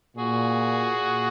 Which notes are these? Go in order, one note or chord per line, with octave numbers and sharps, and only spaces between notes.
A#2 F#4 G#4
A#2